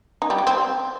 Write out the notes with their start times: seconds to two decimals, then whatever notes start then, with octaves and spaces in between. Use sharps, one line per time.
0.22 D#4
0.30 G3
0.38 G4
0.47 C4